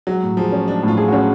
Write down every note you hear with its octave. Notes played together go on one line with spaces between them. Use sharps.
F#3 G#3
A2
F3 G#4
C#4
G#3 D4
A2 F4
G#4
F#4
C#4